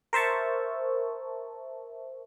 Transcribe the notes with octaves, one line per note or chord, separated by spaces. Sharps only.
A#4 C5 E5 A5 C#6